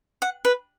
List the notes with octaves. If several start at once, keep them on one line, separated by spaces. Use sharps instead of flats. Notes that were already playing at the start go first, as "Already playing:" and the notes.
F#5
B4